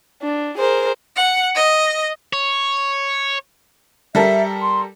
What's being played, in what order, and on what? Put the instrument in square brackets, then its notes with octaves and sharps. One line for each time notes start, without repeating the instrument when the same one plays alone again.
[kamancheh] D4
[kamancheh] G#4 A#4 [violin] C5
[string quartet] F#5
D#5
[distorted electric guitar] C#5
[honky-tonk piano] G3 A4 A#4 [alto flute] E5
[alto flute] C6